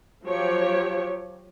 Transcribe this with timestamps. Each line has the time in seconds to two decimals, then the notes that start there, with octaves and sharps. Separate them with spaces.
0.24 F3 F#3 G4 C#5